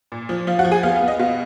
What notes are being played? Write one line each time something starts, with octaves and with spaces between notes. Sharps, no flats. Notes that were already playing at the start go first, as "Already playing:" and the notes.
A#2
F3
F3 F5
F#4 F#5
F3
G#4 G#5
B3 F5
F5
B3
D#5
B2 F5